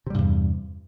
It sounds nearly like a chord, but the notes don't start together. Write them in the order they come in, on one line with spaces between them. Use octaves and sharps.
C3 G3 G2 E2